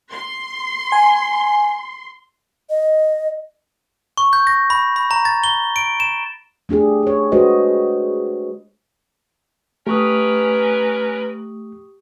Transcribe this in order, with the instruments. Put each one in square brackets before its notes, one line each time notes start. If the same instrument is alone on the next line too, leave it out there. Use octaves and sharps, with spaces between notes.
[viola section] C6
[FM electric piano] G#5
[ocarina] D#5
[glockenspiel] C#6
G6
A#6
B5
B5
A#5
A6
G7
D7
E7
[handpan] A3 D4 G4 G#4
G4 C#5
G#3 D4 F#4 B4 C5 D#5
[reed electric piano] A3 [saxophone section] C#4 A#4 B4 [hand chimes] G4 C#6 D#6